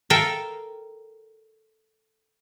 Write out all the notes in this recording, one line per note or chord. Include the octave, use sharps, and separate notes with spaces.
A4 A#4 E5 F5 G5